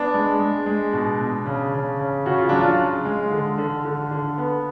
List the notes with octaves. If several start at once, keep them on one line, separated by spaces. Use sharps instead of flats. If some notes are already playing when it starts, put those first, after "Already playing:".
Already playing: B3 D4
G#3
G#3
G#3
B2
B2
C#3
C#3
C#3
C#3 F#4
F4
F#3 D4
F4
C#3
G#3
D3
D3
D3
D3
B3